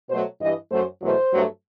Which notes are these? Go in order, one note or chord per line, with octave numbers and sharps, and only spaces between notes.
B2 F#3 A3 C5
G2 E3 G3 D#5
F#2 F#3 A3 C5
E2 B2 F#3 A3 C5
G2 F#3 A3